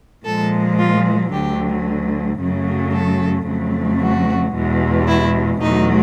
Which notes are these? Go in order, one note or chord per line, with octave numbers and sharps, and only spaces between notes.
A#2 F3 G#3 A4
F4
D2 D3 F#3 G4
F#2 C#3 F#3 A3
A4
F2 C#3 F#3 A3
F#4
E2 B2 G#3
E4
E2 B2 F#3 A3 D#4